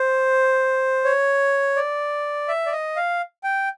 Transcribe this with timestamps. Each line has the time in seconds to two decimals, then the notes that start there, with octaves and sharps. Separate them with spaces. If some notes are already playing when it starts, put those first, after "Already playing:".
Already playing: C5
1.04 C#5
1.76 D5
2.48 E5
2.66 D5
2.72 D#5
2.96 F5
3.44 G5